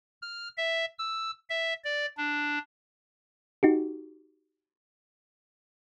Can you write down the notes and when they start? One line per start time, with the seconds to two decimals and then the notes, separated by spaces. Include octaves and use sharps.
0.22 F6
0.58 E5
0.99 E6
1.50 E5
1.84 D5
2.17 D4
3.63 D#4 F#4 G4